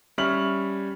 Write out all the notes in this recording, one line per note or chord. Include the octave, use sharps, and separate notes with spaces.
G3 C#4 E5 F6 F#7